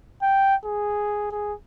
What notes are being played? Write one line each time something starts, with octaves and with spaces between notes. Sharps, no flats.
G5
G#4
G#4